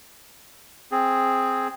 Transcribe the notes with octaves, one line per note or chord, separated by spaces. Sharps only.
C4 G#4